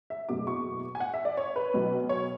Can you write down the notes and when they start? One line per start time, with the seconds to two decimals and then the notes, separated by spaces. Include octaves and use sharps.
0.10 E5
0.29 F#1 E2 B2 F#3 A3 D6
0.47 C#6
0.95 G#5
1.00 F#5
1.14 E5
1.25 D5
1.37 C#5
1.56 B4
1.74 B1 B2 F#3
2.09 C#5